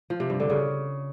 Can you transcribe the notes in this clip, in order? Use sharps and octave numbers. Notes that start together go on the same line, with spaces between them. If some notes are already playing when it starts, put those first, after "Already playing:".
F3
C3
G2
D3
C#3